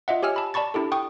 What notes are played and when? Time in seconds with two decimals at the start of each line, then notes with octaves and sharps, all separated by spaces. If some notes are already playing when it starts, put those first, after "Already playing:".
0.08 F4 D#5 E5 F#5
0.23 G4 C#5 G#5 E6 F6
0.36 A5 B5
0.54 D5 A5 B5 C#6 A6
0.74 D4 E4 G4 A4
0.92 G5 C#6 D#6